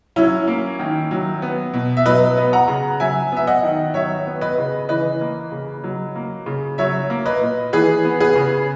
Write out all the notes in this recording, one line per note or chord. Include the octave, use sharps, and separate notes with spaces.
F#3 C#4 E4
A#3
D#3
F#3
B3
B2
E5
F#3 B4 D#5
B3
F#5 A#5
C#3
F#3 E5 G#5
B3 E5
D#5 F#5
D#3
F#3 C#5 E5
B3
B4 D#5
C#3
E3 B4 D#5
A#3
C#3
F#3
A#3
C#3
F#3 C#5 E5
A#3
B4 D#5
A#2
E3 G#4 B4
B3
G#4 B4
C#3